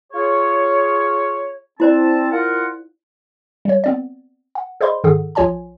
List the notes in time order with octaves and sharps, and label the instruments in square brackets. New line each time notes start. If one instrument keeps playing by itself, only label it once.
[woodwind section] F4 G#4 C#5
[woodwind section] C4 A5 [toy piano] E4 C5 D5
[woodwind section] F4 A#4 F#5
[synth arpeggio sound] G3 C#5
B3 C4 D5
F#5
G#4 C5 D5 D#5 B5 C6
G#2 D#3 G#4 A4 F#5
A#1 F3 F4 C#5 G#5 A5